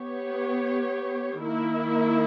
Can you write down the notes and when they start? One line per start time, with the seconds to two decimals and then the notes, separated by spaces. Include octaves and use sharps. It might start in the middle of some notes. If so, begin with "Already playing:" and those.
Already playing: B3 G4 C#5
1.41 D#3 A#3 E4